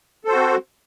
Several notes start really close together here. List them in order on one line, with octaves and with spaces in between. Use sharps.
A4 C5 F#4 C4